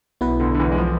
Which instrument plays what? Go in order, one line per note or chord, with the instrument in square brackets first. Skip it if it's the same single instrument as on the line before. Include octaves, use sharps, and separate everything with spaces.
[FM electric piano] B1 B2 B3 E4 B4
[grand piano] D2 D3
D3
E2 E3
G#3
F3